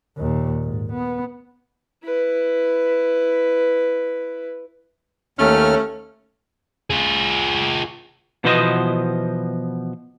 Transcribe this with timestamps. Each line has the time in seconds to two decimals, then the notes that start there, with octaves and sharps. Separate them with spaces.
0.18 D#2 A#2
0.63 G#2
0.93 B3
2.04 E4 B4
5.39 D#2 A3 C#4 F6
6.90 F4 G#4
8.44 B2 E3 F3 B3 C5 D#5